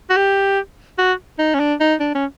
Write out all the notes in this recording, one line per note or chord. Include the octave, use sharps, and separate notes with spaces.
F#4
G4
F#4
D#4
C#4
D4
D#4
D4
C#4